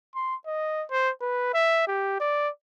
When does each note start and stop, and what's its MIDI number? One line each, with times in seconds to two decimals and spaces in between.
0.15 0.35 84
0.46 0.84 75
0.91 1.10 72
1.21 1.53 71
1.54 1.83 76
1.87 2.19 67
2.20 2.49 74